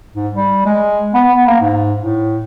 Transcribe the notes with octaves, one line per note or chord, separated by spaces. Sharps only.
G#2
G3
G#3
B3
B3
A#3
G#2
A2